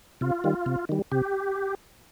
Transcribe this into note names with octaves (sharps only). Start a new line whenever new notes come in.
C3 F4
D#3 G3
C3
D#3 G3
C3 G4